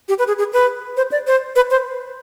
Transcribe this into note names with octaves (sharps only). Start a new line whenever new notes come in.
G4
B4
G#4
G#4
B4
C5
D5
C5
B4
C5